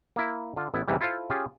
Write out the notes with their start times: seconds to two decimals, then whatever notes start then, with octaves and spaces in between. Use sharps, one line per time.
0.16 A#3 E4
0.56 D3 F4
0.74 A1 B3 E4
0.88 D#2 G#2 C3 E3 G3
1.01 E4 F4 A4 C5 F5
1.30 C#4 F4 G4 G#4